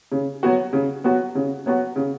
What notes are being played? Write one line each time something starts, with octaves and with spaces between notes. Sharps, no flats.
C#3
F#3 B3 F#4
C#3
F#3 B3 F#4
C#3
F#3 B3 F#4
C#3